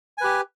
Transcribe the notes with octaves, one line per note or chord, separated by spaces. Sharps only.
G4 B4 G#5